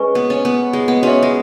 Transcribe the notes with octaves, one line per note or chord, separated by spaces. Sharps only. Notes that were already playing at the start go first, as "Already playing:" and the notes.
Already playing: G#3 C#4 B4 G#5 C#6
B3
C#4
B3
G#3
B3
C#4 F#4 C#5 E5
G#3